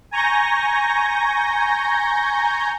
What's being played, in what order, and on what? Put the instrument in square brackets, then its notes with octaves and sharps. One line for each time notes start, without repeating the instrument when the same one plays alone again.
[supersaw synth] G#5 A#5 C#6 G6 A#6